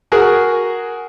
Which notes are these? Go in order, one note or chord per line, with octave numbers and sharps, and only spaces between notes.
F#4 G#4 A#4